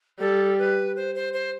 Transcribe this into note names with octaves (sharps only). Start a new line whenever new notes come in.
G3 A4
B4
C5
C5
C5